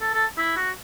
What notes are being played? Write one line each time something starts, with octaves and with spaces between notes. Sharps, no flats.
A4
A4
E4
F#4